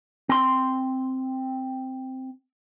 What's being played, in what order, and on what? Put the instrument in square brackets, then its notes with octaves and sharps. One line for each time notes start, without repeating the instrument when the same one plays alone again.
[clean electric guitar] C4 C6